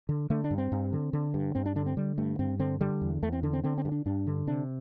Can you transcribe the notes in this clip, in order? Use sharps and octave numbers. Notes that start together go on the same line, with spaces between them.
D3
D3 A3
D4
G2
C4
G2
D3
D3
G2
G2 C4
D4
D3 D4
C4
D3 G3
G2 A3
G2 C4
D3 C4
D3 G3
E2
E2 A3
C4
D3 D4
C4
D3 C4
C4
G2
D4
G2 D4
D3
C3 D4